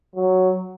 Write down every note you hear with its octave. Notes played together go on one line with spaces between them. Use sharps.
F#3